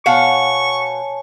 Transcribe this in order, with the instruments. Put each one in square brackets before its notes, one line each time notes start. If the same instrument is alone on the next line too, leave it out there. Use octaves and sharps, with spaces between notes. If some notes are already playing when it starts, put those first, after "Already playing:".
[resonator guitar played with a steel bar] B2 F5 F#5 [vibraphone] C#5 G#5 A5 [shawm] C#6